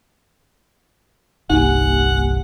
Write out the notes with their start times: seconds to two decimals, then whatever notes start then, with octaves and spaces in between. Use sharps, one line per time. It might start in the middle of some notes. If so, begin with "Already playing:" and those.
1.50 G1 C2 A#3 D#4 G4 F#5 G#5